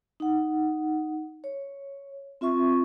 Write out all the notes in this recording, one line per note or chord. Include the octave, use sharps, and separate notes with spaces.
D#4 F#5
C#5
C4 F4 E5 C#6